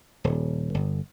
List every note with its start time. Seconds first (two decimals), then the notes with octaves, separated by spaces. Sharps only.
0.24 D#1
0.74 G1